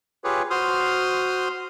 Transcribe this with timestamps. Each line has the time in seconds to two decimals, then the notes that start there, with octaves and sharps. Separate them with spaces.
0.24 F4 G4 G#4 B4 C#5
0.50 F#4 C5 C6 D#6 F6